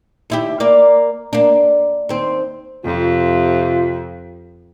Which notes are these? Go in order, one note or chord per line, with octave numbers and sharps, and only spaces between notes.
D#2 E4 G4
A#3 D5
A#3 D4
D#2 C4
F2 C3 F4